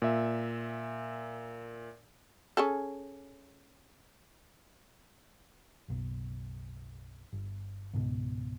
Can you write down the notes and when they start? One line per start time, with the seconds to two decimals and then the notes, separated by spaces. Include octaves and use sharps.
0.02 A#2 E5
2.57 C#4 G#4 A4
5.88 F#1 B1
7.33 G1
7.93 C#2 G#2 B2